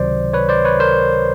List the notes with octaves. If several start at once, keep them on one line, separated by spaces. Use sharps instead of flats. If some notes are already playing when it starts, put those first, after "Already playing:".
Already playing: C#2 C3 D#3 F#3 C5 D5
B4 C#5
C5 D5
B4 C#5
A#4 C5